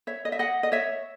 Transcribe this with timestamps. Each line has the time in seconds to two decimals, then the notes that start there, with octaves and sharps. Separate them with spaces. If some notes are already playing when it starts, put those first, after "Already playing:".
0.07 C#5 E5
0.25 D#5
0.32 E5
0.39 D#5 F#5
0.63 D#5
0.72 C#5 E5